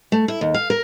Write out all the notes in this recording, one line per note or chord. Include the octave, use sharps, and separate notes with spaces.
A3
E4
D#2
F5
A#4